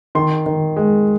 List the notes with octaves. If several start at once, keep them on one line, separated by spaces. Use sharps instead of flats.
D#3 C6
D#3
G#3